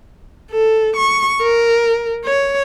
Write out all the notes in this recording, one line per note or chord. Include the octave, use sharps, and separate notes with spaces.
A4
C#6
A#4
C#5